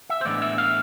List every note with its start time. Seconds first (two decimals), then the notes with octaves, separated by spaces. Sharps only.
0.09 E5
0.21 C5
0.25 A2 E3 G#3 B3 D4 D5
0.42 E5
0.58 F5